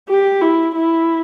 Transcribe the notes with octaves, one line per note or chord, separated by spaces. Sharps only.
G4
E4
E4